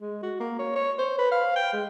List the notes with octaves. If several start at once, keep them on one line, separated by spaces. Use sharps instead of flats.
G#3
F#4
A#3
C#5
C#5
C5
B4
F5
G5
G#3